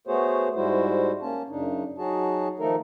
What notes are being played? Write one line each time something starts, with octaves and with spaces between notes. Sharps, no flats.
A3 B3 F#4 G#4 C5 C#5
G#2 G3 G#3 E4 F#4 C5
A#3 C#4 A5
F#2 C#3 D4 D#4
F#3 D#4 F#4 G#4 A5
D#3 F3 A3 D#4 A4 A#4